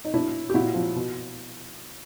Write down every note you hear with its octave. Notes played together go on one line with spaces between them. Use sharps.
D#4
B2 D4 E4
G4
A#2 E4 F#4
F3
B2